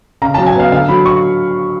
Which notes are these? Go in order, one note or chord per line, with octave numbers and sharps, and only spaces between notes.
C#3 A#5
F#3 A5
G#5
B3 F5
D3 F5
F#3 B5
C#6